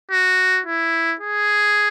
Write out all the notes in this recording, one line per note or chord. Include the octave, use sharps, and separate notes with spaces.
F#4
E4
G#4